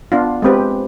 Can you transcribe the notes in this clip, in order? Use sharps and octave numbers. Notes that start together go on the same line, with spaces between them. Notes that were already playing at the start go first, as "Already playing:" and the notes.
B3 D4 F4
G#3 C4 G4 B4